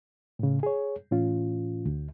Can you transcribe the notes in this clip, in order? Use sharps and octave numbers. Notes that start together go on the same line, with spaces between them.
A2 C#3
G#4 C#5
A2 E3 C#4 F4
D2